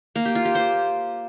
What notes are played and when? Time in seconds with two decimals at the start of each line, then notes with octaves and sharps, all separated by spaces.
0.16 A#3
0.25 G4
0.35 F4
0.45 G4
0.55 C5